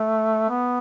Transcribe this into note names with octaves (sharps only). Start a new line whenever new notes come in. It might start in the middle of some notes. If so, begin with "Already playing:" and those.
Already playing: A3
B3